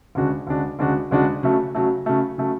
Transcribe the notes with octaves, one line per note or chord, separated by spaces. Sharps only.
D2 C#3 G#3 D4 F#4
D2 C#3 G#3 D4 F#4
D2 C#3 G#3 D4 F#4
D2 C#3 G#3 D4 F#4
C#3 F#3 A3
C#3 F#3 A3
C#3 F#3 A3
C#3 F#3 A3